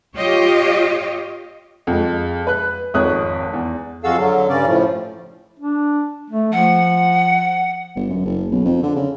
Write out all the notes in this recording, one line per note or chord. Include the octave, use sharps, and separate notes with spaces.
F4 G4 C#5 D#5
F2 G#3
B4 F#6
G#1 F2 C#5 D#6 F#6
E2
F2 G#3 F#4 A4 F5 E6
D3 F#3
G2 C#3 C#4 D5
A2 F3
D4
A3
F3 F#5
G1
F#2
F#1
B1
F2
D3
C#3